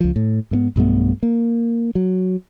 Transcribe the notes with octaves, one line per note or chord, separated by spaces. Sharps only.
C#2 F3
A2
G#2 A3 B3
B1 G2 A3 B3
A#3
F#3